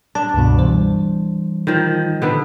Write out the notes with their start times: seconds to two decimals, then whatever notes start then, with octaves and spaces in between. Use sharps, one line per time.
0.15 D4 A5
0.34 C#2 G2 B2
0.58 E3 G3 C5
1.67 D#3 F3
2.22 D3 B3 D4